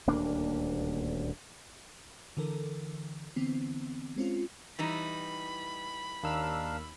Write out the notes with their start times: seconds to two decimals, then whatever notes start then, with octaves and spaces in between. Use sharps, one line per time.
0.07 D#1 D2 A#3 D4
2.37 D3 E3 A4 A#4
3.36 D3 E3 B3 C4
4.16 G#3 C4 C#4 F4
4.79 E3 G3 D#4 B5
6.23 D#2 D4 A#4 F5 E6 F6